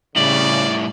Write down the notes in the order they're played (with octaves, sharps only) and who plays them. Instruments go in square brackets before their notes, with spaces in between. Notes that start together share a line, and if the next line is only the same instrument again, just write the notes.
[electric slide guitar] A2 G3 E4 [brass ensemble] C#3 [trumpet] D5 [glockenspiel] F#7